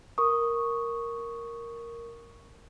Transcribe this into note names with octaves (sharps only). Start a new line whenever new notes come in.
A#4 C#6 D#6